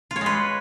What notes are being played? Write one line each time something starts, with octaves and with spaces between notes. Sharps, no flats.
F4
C#5
G#3
B4